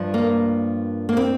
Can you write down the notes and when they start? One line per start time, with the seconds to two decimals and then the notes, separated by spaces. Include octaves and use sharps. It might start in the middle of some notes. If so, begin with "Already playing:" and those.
Already playing: G2 F3
0.14 A#3
1.09 A#3
1.17 C4